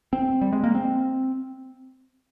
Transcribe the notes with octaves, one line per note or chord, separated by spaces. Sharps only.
C4
G3
G#3
A#3
C4